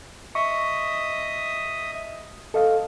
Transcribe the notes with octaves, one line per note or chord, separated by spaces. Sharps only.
D#5 E5 C#6 D#6
A4 D#5 F5